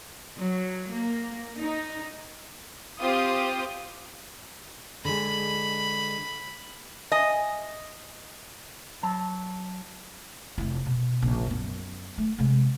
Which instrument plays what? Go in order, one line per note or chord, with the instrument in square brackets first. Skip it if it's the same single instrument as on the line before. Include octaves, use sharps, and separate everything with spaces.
[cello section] F#3
A#3
D#4
[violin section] C4 F4 G4 C5 D#6
[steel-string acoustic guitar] D3 G#3 [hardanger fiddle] B5
[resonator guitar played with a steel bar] D#5 [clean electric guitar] G#5
[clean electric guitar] F#3 A5
[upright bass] F1 E4
B2
A#1 C#3
F#2 B3
A3
C3 G#3